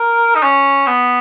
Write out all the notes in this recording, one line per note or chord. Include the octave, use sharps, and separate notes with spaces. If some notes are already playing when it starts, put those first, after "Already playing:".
Already playing: A#4
D#4
C#4
B3